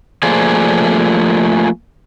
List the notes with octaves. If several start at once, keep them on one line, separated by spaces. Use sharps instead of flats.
F3 A3 A#3 G#4 C5 D5